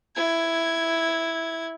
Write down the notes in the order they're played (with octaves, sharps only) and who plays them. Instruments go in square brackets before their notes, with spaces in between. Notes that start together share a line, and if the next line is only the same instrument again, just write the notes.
[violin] E4 G#6